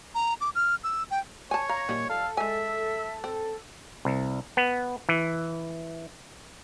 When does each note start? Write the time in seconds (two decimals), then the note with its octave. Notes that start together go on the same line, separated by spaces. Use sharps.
0.15 A#5
0.41 D6
0.55 F6
0.84 E6
1.11 G5
1.51 C#5 G#5 A5
1.69 F5 A#5
1.89 A#2 D#3 F3 G3
2.10 A4 F5
2.37 G#3 E5 G#5
3.24 C4
4.05 C2
4.57 B3
5.09 E3